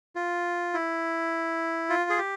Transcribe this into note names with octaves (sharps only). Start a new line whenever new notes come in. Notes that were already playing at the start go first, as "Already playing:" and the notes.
F4
E4
F4
G#4
G4